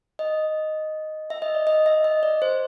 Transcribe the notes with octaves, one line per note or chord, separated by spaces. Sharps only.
D#5
E5
D#5
D5
D#5
E5
D#5
D5
C5